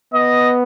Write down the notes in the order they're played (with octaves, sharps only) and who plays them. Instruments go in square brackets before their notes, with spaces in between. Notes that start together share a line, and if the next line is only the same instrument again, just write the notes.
[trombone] B3 [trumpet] D#5